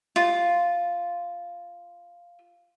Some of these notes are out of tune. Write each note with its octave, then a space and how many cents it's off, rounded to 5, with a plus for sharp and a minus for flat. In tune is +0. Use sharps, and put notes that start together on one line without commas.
F4 -5